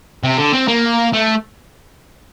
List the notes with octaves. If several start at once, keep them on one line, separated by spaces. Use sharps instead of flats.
C3
D3
C4
A#3
A3